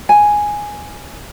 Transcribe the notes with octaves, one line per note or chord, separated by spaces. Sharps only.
G#5